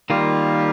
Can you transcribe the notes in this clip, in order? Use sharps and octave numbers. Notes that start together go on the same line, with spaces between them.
D#3 G3 A#3 F4 G4